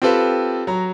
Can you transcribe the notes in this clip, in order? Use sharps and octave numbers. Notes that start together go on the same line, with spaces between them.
C4 F4 G4 A4 B4
F#3 A#5